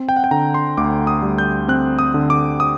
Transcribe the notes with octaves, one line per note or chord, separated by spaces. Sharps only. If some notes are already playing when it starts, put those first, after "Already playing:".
Already playing: C4
G5
F#5
G5
D3 A#5
C6
D2 D6
D#6
G3
G6
C4 F#6
D#6
D3
D6
D#6